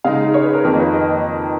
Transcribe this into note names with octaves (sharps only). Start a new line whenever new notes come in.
C#3 G#3 D#4 F5
C#5
B4
A#4
F2 D#3 A#3 A#4
B4
D#5